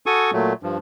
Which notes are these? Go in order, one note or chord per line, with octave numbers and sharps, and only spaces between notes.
F#4 A4 G#5 C#6 D#6
A#2 F#3 A3
G2 F3